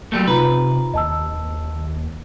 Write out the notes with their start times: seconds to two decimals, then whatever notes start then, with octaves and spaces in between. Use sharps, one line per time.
0.12 F#3 G3 A3 A#3
0.27 C3 D#4 F4 B4 A#5
0.94 D#2 D#5 A5 E6